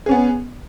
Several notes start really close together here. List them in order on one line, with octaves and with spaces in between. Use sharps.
G#4 C#4 B3